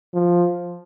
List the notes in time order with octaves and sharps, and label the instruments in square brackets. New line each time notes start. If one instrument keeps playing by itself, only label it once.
[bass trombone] F3